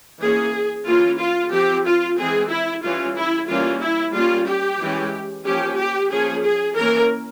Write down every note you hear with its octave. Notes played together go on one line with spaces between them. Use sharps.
E3 A#3 C#4 G#4
E3 A#3 C#4 F4
F4
F3 C4 G4
F4
E3 G#3 C4 G#4
E4
E3 G3 C#4 F4
E4
E3 G3 A#3 C#4 F4
E4
G3 A#3 C#4 F4
G4
E3 G#3 C#4
F3 A#3 C#4 G4
G4
F3 A#3 C#4 G#4
G#4
E3 A#3 C#4 A#4